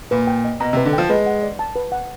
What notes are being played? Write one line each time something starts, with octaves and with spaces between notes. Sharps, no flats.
A#2 B4
G5
D#5
B2 A#5
C3
B4
D3
F3 G5
G#3 B4
F#5
D5
A5
B4
F#5